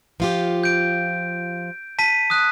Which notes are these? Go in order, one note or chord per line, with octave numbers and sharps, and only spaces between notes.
F3 F4 G4
G6 D7
A5 B6 D#7
D#6 F#6